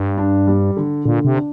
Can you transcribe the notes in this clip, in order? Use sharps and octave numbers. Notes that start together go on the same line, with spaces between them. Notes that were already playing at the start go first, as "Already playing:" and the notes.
Already playing: G2
D4
G3
D3
A#2 D3
C3
D4